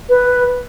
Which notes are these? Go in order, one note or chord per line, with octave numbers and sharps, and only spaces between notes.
B4